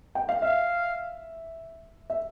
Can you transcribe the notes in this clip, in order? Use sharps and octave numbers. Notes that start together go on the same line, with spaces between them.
G5
F5
E5 F5
E5